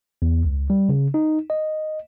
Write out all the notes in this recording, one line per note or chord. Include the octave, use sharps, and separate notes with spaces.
E2
C#2
G3
C#3
D#4
D#5